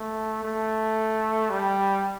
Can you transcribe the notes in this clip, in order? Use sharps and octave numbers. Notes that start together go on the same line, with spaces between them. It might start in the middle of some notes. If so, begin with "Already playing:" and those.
Already playing: A3
A3
G3